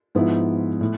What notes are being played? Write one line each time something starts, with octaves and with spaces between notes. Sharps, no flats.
G#2 F3 B3 E4
A2